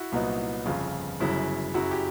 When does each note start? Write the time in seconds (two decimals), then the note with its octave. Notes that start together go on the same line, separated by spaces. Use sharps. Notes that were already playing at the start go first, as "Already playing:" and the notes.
Already playing: E4 F#4
0.12 C2 A#2 F#3 B3 D#4
0.66 G1 F2 C#3 F4
1.20 G1 F#2 C#3 F#3 E4
1.74 F#2 C#3 F#3 E4 F#4
1.91 G4